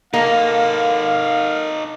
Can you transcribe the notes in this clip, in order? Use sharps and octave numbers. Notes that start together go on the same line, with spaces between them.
A#3 D#4 A4 F5